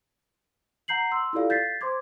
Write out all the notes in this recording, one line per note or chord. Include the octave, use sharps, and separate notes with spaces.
F#5 A#5 G6 C7 F#7
C6 E6
E4 F4 G4 A4 D5 F5
G6 A6 B6 C7
C5 C6 D6 G#6